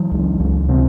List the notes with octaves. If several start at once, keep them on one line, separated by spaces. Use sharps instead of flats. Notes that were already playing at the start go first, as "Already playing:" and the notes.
Already playing: E3 F#3
C#2
C#2
C3